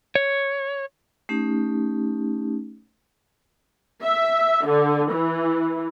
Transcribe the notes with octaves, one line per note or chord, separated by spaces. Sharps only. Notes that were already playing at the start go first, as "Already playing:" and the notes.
C#5
A3 C#4 D#4 G4
E5
D3
E3